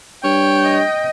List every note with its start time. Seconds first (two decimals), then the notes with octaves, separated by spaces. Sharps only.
0.24 G2 C#5 G5
0.64 D#5